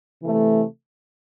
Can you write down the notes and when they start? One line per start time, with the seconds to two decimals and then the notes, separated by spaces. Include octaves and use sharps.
0.22 C3 E3 A3